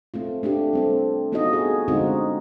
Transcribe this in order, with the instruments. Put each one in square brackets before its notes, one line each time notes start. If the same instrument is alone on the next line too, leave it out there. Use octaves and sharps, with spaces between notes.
[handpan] A3 C4 F4
A3 D4 F4 G4
G3 C4 A4
A3 B3 D#4 F4 F#4 D#5
F#4 G#4
D3 G#3 C4 D#4 F4 F#4